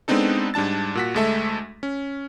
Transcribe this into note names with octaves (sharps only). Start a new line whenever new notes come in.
G#3 B3 C4 D4 D#4 A4
G#2 G3 D4 A5 A6
A#2 F#4 B6
D2 G#3 A3 A4 E5
C#4